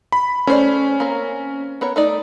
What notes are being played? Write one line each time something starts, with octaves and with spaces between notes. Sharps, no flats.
B5
A3 C#4 C5 D5
A#3 C4 A#4
B3 A#4 C#5
A3 D#4 D5